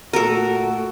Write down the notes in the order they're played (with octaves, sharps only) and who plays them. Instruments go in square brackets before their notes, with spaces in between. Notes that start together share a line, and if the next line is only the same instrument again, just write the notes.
[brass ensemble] A#2 A3 F#4 [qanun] A4 A#4